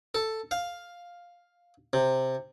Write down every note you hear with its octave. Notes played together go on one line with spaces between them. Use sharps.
A4
F5
C3